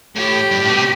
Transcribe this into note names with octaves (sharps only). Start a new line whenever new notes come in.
A2 G4
G2
A2
B2
C3